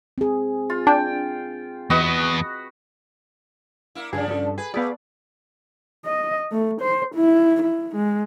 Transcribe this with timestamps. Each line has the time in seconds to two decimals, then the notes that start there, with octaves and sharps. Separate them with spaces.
0.18 C4 G#4
0.70 F4
0.87 D4 G5
1.90 E2 B3 F#4 B4 D#5
3.95 A#3 E4
4.13 G2 C#3 F3 D4 G#4
4.28 C#4 A4
4.58 G#4 B4
4.74 A3 B3 G#4 B4 D5 F5
6.05 D#5
6.52 A3
6.81 C5
7.15 E4
7.62 E4
7.96 G#3